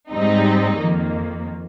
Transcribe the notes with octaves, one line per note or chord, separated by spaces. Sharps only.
G#2 G3 C4 D#4
F2 D#3 A#3